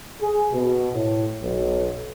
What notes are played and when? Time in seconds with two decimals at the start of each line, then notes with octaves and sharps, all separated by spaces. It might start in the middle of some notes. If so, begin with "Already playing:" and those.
0.21 G#4
0.52 B2
0.93 A2
1.42 B1